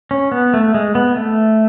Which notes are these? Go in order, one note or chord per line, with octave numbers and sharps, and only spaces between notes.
C#4
B3
A3
G#3
B3
A3